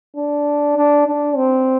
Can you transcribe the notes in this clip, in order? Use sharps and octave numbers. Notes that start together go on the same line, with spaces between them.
D4
D4
D4
C4